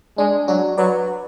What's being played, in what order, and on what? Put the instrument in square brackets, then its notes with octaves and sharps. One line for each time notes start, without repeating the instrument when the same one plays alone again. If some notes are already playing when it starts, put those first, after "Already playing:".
[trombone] G#3 [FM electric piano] D4
[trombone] F#3 [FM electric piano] D4 F#4
[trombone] F#3 [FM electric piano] B4 D5